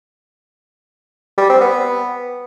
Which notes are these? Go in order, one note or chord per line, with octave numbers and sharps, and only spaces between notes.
G3
C4
B3